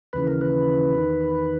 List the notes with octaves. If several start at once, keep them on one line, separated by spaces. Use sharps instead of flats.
D#2 C#3 E3 B4
A#4
B4
E2 D#3